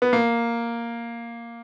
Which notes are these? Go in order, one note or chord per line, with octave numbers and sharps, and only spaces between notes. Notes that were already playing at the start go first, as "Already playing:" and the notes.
B3
A#3